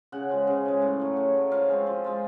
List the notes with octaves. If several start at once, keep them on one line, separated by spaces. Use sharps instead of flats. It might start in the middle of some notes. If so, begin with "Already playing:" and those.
C#3 F#5
F3 G#3
C#3
F3 G#3
A2
F#3 A3
A2
F#3 A3
F3 F5
G#3 C4 F4
F3
G#3 C4 F4